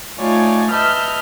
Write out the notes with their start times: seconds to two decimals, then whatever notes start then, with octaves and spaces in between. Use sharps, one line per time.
0.18 A3 D#4 F4 C#5 D5 G#5
0.72 B4 D#5 E5 A5 F6 G6